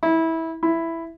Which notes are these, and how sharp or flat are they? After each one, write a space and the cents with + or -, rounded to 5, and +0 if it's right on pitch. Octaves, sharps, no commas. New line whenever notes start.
E4 -20
E4 +5